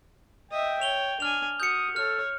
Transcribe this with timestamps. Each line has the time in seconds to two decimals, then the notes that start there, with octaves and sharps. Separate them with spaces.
0.51 D#5 E5 G5
0.82 C#5 F7 G7
1.20 D4 G#5 F6 F7
1.60 F#4 D#6 G6 C#7
1.96 A4 C#5 F6